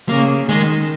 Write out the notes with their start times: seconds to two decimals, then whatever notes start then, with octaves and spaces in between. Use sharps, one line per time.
0.09 C#3 A#3
0.48 D#3 G#3